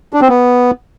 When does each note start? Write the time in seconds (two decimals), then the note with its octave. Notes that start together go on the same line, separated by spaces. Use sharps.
0.13 D4
0.21 C4
0.29 B3